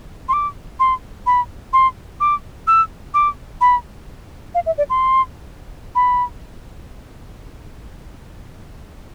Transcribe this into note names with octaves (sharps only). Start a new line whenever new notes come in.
C6
D6
C6
B5
C6
D6
E6
D6
B5
F5
E5
D5
C6
B5